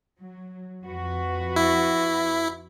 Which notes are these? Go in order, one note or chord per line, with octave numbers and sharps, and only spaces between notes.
F#3
F2 F#4 B4
E4